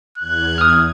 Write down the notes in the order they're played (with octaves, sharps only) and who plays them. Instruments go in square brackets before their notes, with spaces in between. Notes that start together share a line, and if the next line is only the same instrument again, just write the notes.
[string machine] E2 G#6 [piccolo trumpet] F#6
[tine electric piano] D#6 F6